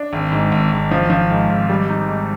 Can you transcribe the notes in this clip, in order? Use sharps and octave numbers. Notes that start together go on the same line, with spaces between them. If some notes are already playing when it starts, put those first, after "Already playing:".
Already playing: D4
G#1
G#2
G#1
G#1
F3
F3
G#2
G#1
G3
D#4
G#2